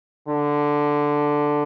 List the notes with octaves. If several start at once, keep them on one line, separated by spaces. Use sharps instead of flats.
D3